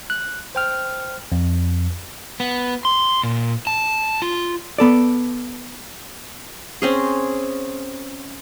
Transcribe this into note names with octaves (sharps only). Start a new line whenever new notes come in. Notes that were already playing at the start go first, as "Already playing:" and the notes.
F#6
C5 G5 F6
F2
B3
C6
A#2
A5
F4
B3 A4 D5
C4 C#4 G#4